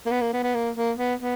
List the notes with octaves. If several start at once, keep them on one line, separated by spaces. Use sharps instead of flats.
A#3
B3
A#3
B3
B3
A#3
A#3
B3
B3